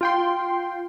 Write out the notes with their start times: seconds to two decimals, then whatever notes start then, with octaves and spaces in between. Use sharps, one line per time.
0.01 F4 G5 C6